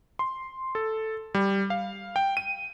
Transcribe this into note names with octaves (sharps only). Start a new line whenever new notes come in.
C6
A4
G3
F5
G5
D#7